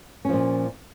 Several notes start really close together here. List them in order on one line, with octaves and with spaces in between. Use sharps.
C#4 F3 A#2